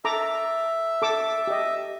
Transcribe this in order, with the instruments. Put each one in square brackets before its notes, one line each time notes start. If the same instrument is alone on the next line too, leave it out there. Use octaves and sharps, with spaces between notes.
[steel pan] A4 A#5 D6 [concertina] E5
[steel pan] A4 D6 E6
G4 D#5